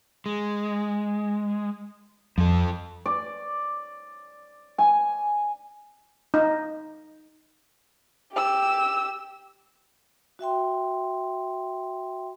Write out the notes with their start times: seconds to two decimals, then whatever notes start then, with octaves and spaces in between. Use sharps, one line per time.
0.26 G#3
2.38 F2 F3 A4
3.06 D5
4.78 G#5
6.34 D#4
8.33 G4 E6
10.39 F#4 E5 G5 C6